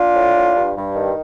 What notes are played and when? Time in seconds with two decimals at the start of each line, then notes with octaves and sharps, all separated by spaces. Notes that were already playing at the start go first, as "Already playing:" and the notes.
Already playing: D4 F4
0.14 A2
0.35 A2
0.55 G2
0.76 G2
0.96 D#3